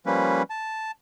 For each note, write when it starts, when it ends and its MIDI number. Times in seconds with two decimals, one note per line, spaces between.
0.06 0.42 53
0.06 0.42 55
0.06 0.42 58
0.06 0.42 61
0.06 0.42 71
0.50 0.91 81